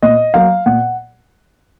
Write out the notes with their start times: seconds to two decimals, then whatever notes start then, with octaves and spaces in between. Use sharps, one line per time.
0.03 A#2 D#5
0.34 F#3 A#3 F5
0.66 A#2 F#5